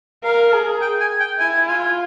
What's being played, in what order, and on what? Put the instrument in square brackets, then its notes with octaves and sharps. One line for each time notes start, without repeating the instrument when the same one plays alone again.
[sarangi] A#4 [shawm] F5
[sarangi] G#4
[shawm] G5
G#5
G5
[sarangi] E4 [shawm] G#5
[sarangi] F4 [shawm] G#5